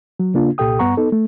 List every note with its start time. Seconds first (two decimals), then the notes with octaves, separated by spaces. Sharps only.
0.19 F#3
0.34 C#3 A#3 D4 F4
0.58 C2 A#2 G4 A4 G5 D#6
0.79 G2 B3 F#5 A#5 C#6
0.97 B3 D#4 A4
1.12 A3